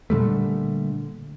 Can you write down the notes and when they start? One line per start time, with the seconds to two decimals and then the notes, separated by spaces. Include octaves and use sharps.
0.10 A#2 D3 G3 A3